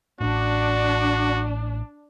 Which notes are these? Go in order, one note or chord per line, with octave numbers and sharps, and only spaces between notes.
A1 A2 D4 F#4